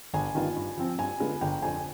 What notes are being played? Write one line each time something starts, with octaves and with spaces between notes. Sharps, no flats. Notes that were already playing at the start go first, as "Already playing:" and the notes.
G1 G#5
G2 D#3 B3 F4
G2
F3 C4
G2 G#5
D3 G#3 B3 F4
G1 G5
F2 D3 G#5